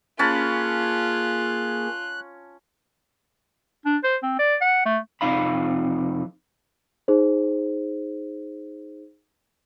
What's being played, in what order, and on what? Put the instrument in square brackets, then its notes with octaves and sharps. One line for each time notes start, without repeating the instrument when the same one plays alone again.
[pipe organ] A#3 G#4 [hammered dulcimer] C#4 A5 B5 [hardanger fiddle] F4 [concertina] F#6
[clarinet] D4
C5
C4
D5
F#5
A3
[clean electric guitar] F2 C3 F3 D#4 F5 B5
[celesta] D#4 G#4 C5